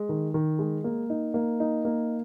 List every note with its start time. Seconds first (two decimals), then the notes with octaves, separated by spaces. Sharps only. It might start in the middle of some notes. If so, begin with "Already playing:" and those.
Already playing: G#3
0.09 D#3
0.34 D#3
0.59 G#3
0.84 A#3
1.10 D#4
1.34 A#3
1.60 D#4
1.85 A#3